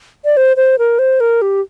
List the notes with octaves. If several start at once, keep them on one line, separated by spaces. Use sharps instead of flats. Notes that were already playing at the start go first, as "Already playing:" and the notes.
D5
C5
C5
A#4
C5
A#4
G4